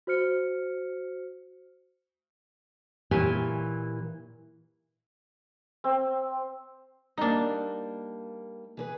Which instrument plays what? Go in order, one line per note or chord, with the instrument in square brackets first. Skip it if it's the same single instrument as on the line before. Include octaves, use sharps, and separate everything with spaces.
[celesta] F#4 C5 F6 C#7
[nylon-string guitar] A#2 E3 G4 C#5 G#5
[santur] C4
[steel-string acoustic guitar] G3 A#3 [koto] D4 D#4
[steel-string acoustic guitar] E3 G#4 B4